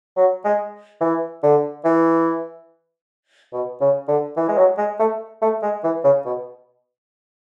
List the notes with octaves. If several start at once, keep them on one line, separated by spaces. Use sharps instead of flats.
F#3
G#3
E3
D3
E3
B2
C#3
D3
E3
G#3
F#3
G#3
A3
A3
G#3
E3
C#3
B2